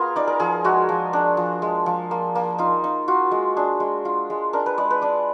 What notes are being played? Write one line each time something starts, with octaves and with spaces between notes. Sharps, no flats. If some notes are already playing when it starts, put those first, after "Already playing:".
Already playing: B3 F4 G#4 A#4
D#4 D5
A#4
F3 G#4
G#3 F#4
F3
D4
F3
G#3
F3
A#3
A#3
D#4 F4
D#4
F4 F#4
G#3
D4 G#4
G#3
F4
G#3
D4 A#4
B4
G#3 D5
B4
D4 D5